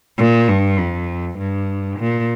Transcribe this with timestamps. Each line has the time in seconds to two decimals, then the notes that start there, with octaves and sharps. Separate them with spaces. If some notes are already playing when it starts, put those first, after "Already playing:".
0.18 A#2
0.48 G2
0.78 F2
1.38 G2
1.99 A#2